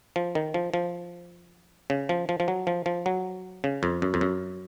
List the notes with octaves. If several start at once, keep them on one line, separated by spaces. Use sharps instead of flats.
F3
D#3
F3
F3
C#3
F3
F3
F3
F#3
F3
F3
F#3
C#3
F2
F#2
F2
F#2